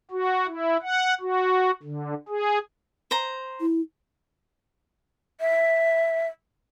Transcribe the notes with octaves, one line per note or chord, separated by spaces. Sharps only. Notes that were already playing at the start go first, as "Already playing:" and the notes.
F#4
E4
F#5
F#4
D3
G#4
C5 A#5
E4
E5